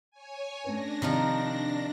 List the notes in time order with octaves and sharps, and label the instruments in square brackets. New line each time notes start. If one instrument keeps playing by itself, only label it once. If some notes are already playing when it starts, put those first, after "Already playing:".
[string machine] C#5 G#5
[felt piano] A3 C#4 B4 [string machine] D4 A#6
[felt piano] C3 D#4 A5 [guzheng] D#3 F3 F4